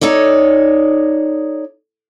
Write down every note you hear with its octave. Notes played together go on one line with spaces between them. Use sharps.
D#4 A4 C#5 D5